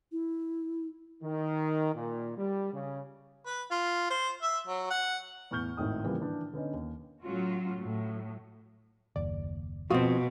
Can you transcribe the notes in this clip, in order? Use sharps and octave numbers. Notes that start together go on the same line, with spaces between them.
E4
D#3
A#2
G3
C#3
B4
F4
C5
E5
F#3
F#5
E2 A2 C#6 F6 G6 G7
G#1 A2 D#3 D#6
C#3 E3 F3 G3 A#3
D#3 E3 D4
D3 B3 C#4 D#4
D#2
A2 F#3 C#4 F4 F#4
A2 F#3
F#1 D#2 D5
B2 F3 C4 F#4 F5 D#6